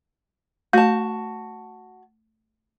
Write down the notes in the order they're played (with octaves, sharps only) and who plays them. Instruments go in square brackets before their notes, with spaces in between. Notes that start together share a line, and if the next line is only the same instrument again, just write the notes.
[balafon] A3 [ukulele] F#4 A5